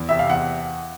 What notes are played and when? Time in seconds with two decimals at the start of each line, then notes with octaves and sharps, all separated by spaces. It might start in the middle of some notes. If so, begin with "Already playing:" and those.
Already playing: E2
0.09 C3 E5
0.19 F5
0.30 E2 F#5